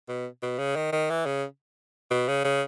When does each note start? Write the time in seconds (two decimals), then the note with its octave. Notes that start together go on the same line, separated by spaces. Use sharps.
0.08 B2
0.42 B2
0.59 C#3
0.76 D#3
0.92 D#3
1.10 E3
1.26 C#3
2.11 B2
2.28 C#3
2.44 C#3